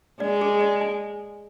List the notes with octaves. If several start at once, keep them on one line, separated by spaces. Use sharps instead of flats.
G#3 D5
G#4
D5
G#5